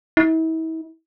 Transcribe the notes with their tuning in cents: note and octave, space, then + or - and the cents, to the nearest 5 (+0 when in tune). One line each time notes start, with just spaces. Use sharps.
E4 -40